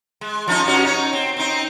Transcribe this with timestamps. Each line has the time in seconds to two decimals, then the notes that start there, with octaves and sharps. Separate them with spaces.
0.21 G#3
0.48 F3 C#4 D#4
0.66 G2 C#4 F#4
0.85 D#4 C#5
1.13 C4
1.37 C4 D#4